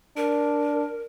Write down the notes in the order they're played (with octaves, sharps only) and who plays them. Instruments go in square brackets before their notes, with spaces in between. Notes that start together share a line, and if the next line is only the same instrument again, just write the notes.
[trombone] D4 [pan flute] A#4